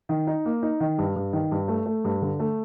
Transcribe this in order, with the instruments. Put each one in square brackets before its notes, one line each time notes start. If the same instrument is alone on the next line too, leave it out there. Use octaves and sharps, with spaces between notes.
[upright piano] D#3
D#4
A#3
D#4
D#3
G2
G2
D#3
G2
A3
A3
G2
D3
A3